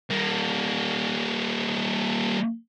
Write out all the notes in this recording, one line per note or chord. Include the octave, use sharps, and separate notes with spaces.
G3 A#3